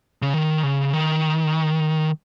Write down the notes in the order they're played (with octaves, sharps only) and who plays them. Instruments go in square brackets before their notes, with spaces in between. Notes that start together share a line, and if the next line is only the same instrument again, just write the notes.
[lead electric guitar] C#3
D#3
C#3
D#3